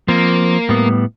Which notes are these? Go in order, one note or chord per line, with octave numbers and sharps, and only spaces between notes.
F3 A#3 C4
A2 G3 B3